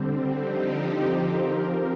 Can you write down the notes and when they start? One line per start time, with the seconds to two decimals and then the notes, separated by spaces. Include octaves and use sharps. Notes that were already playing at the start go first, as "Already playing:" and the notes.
Already playing: D3 G3 C4
0.44 D3 F3 C4 D#4 G4
1.31 F3 C4 G4 A#4